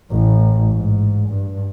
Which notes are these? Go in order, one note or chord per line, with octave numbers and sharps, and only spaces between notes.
A1 A2
G#2
G2